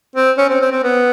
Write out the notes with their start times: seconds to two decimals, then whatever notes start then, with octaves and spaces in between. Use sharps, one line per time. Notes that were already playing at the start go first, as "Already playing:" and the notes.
0.16 C4
0.38 C#4
0.50 C4
0.61 C4
0.72 C4
0.83 B3